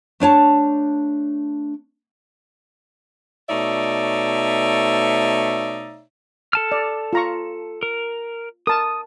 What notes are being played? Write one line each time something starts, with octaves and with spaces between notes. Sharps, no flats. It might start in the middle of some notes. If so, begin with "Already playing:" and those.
A3 D4 C#5 A5
B2 A3 D#4 C#5 D5 E5
A4 A5 F6
D5
F4 A#5 C#6
A#4
A#4 A5 D#6